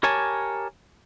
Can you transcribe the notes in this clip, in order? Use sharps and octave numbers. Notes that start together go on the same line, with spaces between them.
G4 A#4 C#5 G#5 A5